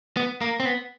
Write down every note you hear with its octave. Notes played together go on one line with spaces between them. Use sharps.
B3
A#3
C4
B3